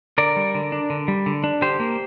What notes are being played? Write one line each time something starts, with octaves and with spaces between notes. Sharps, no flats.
D3 A#4 D5
G3
D3
D4
D3
G3
D3
D4
D3 G4 C5
A#3